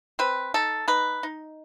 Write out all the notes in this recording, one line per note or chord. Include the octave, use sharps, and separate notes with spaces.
C4 B4
D#4 A4
D#4 B4
D#4